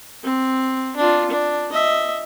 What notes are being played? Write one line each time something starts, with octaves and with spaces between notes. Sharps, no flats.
C4
D4 F4
D4
D#5 E5